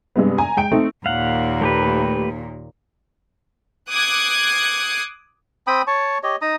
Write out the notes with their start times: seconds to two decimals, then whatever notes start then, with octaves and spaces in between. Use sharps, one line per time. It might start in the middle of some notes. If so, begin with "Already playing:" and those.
0.16 G2 C3 G#3 B3
0.38 G#5 A#5
0.57 G#3 G5 D7
0.72 A3 C4 D#4
1.06 D#2 A#2 F5 F#5
1.61 A3 G4 B4
3.89 D6 D#6 F#6 G#6 C7 C#7
5.67 C4 G5 B5 D#6
5.87 C#5 A5 C#6
6.23 G4 C#5 D#5
6.42 D#4 A#5 D#6